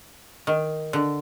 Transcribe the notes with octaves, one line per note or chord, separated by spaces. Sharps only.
D#3
D3